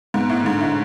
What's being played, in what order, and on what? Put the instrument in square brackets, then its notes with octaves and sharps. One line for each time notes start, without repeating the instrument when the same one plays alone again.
[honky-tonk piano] G#2 [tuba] B3
[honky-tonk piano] A2
[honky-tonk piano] G#2 [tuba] D3
[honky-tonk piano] A2